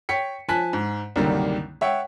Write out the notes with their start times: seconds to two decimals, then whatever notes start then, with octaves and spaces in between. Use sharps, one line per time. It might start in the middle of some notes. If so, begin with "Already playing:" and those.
0.09 C#5 G5 B6 C#7
0.48 F3 G#5 A5 F#6 B6
0.73 G#2
1.16 C2 F#2 D3 D#3 G3 A#3
1.81 C#5 E5 F#5 G5